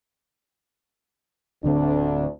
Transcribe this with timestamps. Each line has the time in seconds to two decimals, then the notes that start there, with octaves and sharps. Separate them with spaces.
1.64 D1 D2 D3 C4 D4